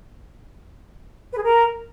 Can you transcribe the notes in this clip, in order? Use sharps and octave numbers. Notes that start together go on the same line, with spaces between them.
B4
G#4
A#4